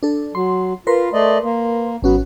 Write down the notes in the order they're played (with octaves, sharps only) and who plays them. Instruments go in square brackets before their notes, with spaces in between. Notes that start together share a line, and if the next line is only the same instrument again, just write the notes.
[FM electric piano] D4 A4
[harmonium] F#3 [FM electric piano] C6
[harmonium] F4 [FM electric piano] A#4 B4 C6
[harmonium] A3 D5 D#5
A#3
[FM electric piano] G#1 C#4 F#4 [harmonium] F#3 B3